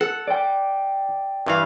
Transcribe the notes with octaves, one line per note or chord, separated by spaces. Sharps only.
A4 F#5
D5 G5
G2 E3 F5